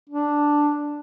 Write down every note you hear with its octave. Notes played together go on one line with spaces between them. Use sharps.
D4